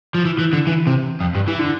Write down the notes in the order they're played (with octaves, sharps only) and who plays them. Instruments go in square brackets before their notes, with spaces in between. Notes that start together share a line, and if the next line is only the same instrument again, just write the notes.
[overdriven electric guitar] F3
E3
E3
D3
E3
C3
F2
G2
E3
D3